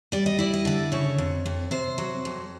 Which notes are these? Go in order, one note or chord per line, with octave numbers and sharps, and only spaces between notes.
G3 D5
D#5
E4 D5
D#5
D3 D5
C#3 C#5
F2
F2
C3 C5
F#3
F2